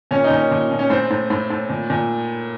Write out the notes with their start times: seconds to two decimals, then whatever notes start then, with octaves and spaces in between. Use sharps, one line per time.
0.11 A#2 C#4
0.24 D#4
0.30 A#2
0.37 C#4
0.51 A#2
0.71 A#2
0.79 C#4
0.90 A2 C4
1.11 A2
1.30 A2
1.50 A2
1.69 A#2
1.90 A#2